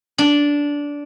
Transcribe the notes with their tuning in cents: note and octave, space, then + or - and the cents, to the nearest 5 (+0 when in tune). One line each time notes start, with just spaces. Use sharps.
D4 -15